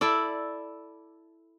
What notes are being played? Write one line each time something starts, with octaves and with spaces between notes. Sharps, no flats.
E4 A4 D5